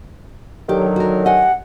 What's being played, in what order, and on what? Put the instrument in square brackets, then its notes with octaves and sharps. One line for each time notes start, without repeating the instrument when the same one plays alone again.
[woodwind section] D3 D#3 F#3 [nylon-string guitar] G4
[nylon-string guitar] F#4 A#4
[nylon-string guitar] G4 D#5 G#5 [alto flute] F#5